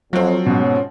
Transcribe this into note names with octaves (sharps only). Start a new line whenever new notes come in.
F2 F3 F#3 C4
G#2 B2 C#4